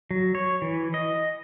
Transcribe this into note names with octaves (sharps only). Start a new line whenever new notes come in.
F#3
C#5
E3
D#5